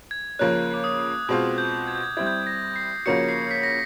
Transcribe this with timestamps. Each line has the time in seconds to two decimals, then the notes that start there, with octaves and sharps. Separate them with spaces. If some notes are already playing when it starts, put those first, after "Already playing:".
0.11 G#6
0.39 C#3 F3 A#3 C#4 F#6
0.74 D6
0.84 D#6
1.28 B2 G#3 C4 F4 F#6
1.58 G6
1.88 G#6
1.96 G6
2.03 G#6
2.17 G3 C4 E4 G#6
2.27 G6
2.36 G#6
2.47 A#6
2.76 C7
3.06 C#3 F3 A#3 C#4 F#4 C#7
3.29 C7
3.51 B6
3.63 A#6